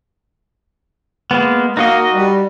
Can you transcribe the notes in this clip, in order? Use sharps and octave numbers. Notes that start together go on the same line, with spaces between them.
G#3 A#3 B3
A#3 D#4 F#4 D#5
G3